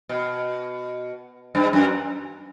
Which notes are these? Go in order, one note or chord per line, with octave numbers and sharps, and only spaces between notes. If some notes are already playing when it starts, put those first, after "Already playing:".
B2
G2
F#2